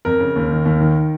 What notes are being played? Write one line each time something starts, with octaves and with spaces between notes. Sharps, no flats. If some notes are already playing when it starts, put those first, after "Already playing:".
F2 A#4
C#3
D#2
D#3
D#2
D#3